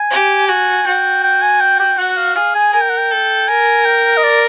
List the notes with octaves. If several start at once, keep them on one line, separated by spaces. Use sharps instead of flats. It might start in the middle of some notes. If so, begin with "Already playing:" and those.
Already playing: G#5
G4
F#4 G#5
F#4 G5
G5
G#5
G5
G5
F#4 F#5
F5
G#4 F5
G#5
A#4 G#5
G5
F#5
G5
A4
A#4 G#5
G5
D#5
D5